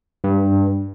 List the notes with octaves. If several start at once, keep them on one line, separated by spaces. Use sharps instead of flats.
G2